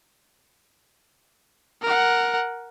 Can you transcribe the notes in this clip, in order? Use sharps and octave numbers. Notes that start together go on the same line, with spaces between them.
A#4 F#5